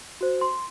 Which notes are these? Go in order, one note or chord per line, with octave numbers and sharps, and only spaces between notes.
F#4 C5
C6